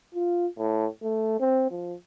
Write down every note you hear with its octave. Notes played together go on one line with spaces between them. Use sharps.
F4
A2
A3
C4
F3